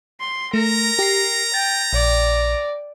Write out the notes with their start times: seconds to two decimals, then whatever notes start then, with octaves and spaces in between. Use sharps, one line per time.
0.20 C6
0.54 A3 A#4 A#5
0.99 G4 C7
1.54 G5 A6
1.93 A#1 D5